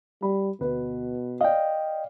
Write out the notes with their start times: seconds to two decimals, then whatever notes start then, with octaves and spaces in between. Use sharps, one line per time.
0.22 G3 B5
0.61 D2 B2 B4
1.41 D5 D#5 F5 G5